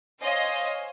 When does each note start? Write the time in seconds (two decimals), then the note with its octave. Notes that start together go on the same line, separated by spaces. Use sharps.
0.21 C5 C#5 D#5 F5 G#5